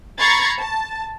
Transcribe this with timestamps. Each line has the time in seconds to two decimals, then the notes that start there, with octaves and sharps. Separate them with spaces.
0.19 A#5 B5 C#6 G#6 A6 C7
0.59 A5